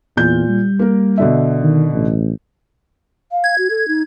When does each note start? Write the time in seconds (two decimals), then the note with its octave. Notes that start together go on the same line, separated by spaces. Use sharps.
0.17 E2 A#2 G6
0.48 G3
0.79 A#3 A#4
1.18 B2 D3 E5
1.62 D#3
1.93 A1
3.31 F5
3.44 G#6
3.58 F#4
3.70 A4
3.88 D#4